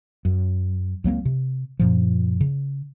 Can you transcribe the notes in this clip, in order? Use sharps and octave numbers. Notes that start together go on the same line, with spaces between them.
F#2
C#2 F#3 A#3 C4
C3
F#2 A#2 F3
C#3